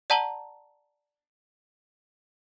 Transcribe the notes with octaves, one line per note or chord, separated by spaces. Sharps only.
D5 F#5 A5 A#5 F#7 G7